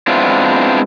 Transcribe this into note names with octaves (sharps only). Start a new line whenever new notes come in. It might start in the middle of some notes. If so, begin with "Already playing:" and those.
G#3 B3 C4 D4 E4 F4